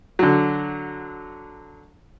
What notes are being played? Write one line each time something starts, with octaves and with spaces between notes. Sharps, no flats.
D3 F#3